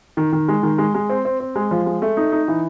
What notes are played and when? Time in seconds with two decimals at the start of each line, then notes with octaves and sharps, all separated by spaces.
0.17 D#3
0.33 D#3
0.48 G#3
0.63 D#3
0.78 G#3
0.94 G#3
1.10 C4
1.25 C4
1.40 C4
1.56 G#3
1.71 F3
1.86 G#3
2.02 A3
2.17 D#4
2.32 D#4
2.48 E3